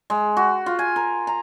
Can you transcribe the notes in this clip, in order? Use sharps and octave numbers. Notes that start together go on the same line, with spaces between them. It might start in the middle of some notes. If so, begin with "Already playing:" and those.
G#3
F#4
F4
G#5
A#4
A#5